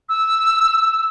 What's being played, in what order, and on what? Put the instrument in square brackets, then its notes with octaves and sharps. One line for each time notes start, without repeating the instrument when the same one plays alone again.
[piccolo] E6